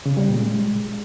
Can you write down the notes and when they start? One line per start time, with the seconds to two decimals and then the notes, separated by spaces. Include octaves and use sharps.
0.06 C#3
0.17 G3
0.28 A#2
0.40 G#3